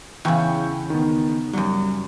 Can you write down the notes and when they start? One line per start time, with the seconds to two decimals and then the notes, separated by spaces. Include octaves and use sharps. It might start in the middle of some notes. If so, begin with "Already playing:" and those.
0.25 E2 C#3 E4 G5 C#6
0.90 D#3 B3
1.53 F#2 F#3 G3